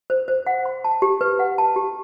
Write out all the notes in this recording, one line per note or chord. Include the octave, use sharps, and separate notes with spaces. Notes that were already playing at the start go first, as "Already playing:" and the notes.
C5
C5
F#5
C6
A5
G4
B4
F#5
A5
G4